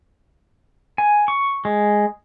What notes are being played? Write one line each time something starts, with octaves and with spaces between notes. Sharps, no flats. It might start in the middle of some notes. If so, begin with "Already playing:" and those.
G#5
C#6
G#3